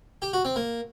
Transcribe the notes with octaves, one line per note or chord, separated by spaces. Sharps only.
G4
F#4
C4
A#3